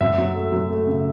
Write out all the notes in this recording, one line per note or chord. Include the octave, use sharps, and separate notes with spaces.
F#2 E5
F#3
A3
F#3
A3
C#3